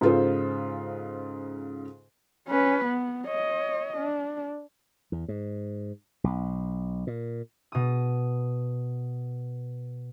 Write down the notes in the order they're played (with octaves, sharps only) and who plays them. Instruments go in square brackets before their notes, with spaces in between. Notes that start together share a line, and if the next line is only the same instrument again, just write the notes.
[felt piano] G#2 C#3 F4 A4 C5
[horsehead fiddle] C#4 B4
B3
C#5 D#5
D4
[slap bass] E2
G#2
B1
A#2
[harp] B2 D#6